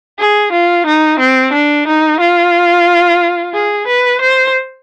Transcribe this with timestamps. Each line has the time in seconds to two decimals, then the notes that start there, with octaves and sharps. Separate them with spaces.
0.19 G#4
0.53 F4
0.86 D#4
1.20 C4
1.53 D4
1.87 D#4
2.20 F4
3.54 G#4
3.87 B4
4.21 C5